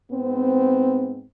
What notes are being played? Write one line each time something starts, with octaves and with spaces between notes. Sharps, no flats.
G#2 B3 C4